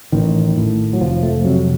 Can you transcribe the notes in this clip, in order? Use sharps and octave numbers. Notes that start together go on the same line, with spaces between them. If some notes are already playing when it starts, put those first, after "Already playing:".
A1 D#3
A2
F#3
F1 F3
A3
F2 C3 F#3